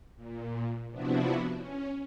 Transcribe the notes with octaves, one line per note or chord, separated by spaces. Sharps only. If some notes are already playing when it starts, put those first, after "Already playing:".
A#2
C3 F3 B3 D4 E4 F#4
C#4